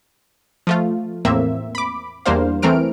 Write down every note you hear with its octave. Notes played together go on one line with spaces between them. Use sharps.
F3 A3 F4
E2 A2 A#3 C4 E5
B5 D6
E2 G3 A#3 D4 C5 F5
E3 A3 C4 A#4 F6 D7